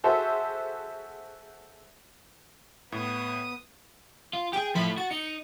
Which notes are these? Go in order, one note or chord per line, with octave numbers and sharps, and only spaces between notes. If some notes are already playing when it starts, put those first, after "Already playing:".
F#4 G#4 A4 C5 E5
A2 B3 D#6
F4
G4 G#4 G5
F3 A3 E4 B5
F#4 A6
D#4 C#7